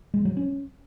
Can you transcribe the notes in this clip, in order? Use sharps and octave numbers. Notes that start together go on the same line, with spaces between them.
G#3
F#3
C#4